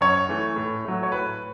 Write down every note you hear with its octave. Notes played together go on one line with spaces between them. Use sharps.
F#2 C#5
E3 A3
A2
F#3 A3
C#5
A2 B4